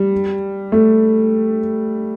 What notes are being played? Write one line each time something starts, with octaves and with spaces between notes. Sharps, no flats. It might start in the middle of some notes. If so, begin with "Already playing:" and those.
Already playing: G3
A3